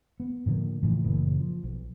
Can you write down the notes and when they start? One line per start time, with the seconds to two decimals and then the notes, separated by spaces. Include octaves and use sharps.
0.20 B3
0.46 A2 D3 F3 A#3
0.83 A2 C#3 E3 F3
1.04 F#1 A#2 C#3 E3
1.40 F3
1.64 B1